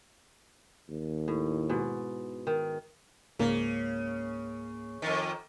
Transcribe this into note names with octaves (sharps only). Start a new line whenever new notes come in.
D#2
A2
G#2 B2
D#3
C#2 G#2 C#3 A#3
F2 D#3